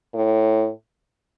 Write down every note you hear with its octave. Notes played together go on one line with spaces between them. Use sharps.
A2